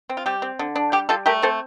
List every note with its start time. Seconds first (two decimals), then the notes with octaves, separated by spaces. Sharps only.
0.10 C4
0.17 F4
0.26 G3 G4
0.42 C4
0.59 D3
0.76 D4
0.92 G3 G4
1.09 G3 F4 A4
1.26 A3 G4 A#4
1.42 C4 A4 C5